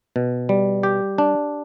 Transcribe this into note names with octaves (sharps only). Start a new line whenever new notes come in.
B2
G3
G4
D4